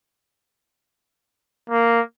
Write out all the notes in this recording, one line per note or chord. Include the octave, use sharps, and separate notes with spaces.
A#3